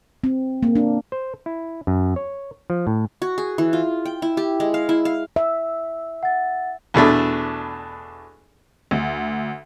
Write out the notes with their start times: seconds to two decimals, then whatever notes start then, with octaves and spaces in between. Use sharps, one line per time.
0.24 C4
0.63 A#3
0.76 D4
1.12 C5
1.46 E4
1.87 F#2
2.16 C#5
2.70 F3
2.87 A2
3.22 F#4
3.38 G#4
3.58 E3
3.73 F4
4.05 G5
4.22 E4
4.37 G4
4.60 G#3
4.74 F5
4.89 E4
5.05 F5
5.36 E5
6.23 F#5 A6
6.94 E2 B2 A3 D4
8.91 D2